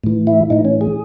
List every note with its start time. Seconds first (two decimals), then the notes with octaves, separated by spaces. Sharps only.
0.04 A2 E3
0.27 E4
0.50 A2 E3 D#4
0.65 C#4
0.81 G#4